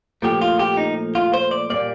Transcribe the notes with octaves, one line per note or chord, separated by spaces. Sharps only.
A#2 F3 A3 G4
F4
G4
D#4
F4
C5
D5
A#2 G3 A#3 D5